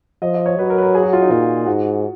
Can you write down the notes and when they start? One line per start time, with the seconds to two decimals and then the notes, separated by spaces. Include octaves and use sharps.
0.22 F3 D#5
0.34 D#5
0.46 C#5
0.57 F#3 B4
0.70 A#4
0.78 B4
0.83 A#4
0.95 G#4
1.03 F#4
1.13 F4
1.22 D#4
1.31 A#2 F4
1.66 G#2 F#4